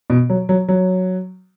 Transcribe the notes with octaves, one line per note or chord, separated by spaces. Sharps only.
B2
F#3
F#3
F#3